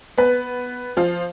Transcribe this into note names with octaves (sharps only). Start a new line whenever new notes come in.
B3 B4
F3 F4